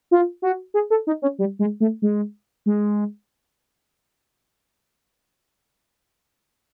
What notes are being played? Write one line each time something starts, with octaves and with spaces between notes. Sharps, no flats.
F4
F#4
G#4
A4
D#4
C#4
G3
G#3
A3
G#3
G#3